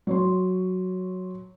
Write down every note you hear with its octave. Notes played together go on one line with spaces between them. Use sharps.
F#3 C#5 C6